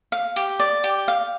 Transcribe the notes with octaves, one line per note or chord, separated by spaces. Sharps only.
F5
G4
D5
G4
F5